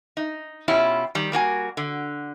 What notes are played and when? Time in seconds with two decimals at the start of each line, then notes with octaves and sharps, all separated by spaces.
0.17 D#4
0.68 B2 C#4 E4 F4 G4
1.15 D#3 G3
1.32 G3 A#3 F#4 G#5
1.77 D3